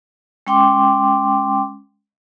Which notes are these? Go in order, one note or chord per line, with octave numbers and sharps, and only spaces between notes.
G#3 C#4 G5 C6 D6